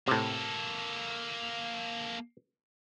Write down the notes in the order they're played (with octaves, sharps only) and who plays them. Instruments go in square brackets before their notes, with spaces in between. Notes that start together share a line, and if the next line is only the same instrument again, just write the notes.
[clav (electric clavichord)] A2 C3 [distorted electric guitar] A#3 A4